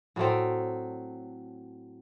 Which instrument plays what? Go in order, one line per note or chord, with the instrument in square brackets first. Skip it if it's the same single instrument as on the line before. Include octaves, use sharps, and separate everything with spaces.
[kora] A2 F#3 A3 C4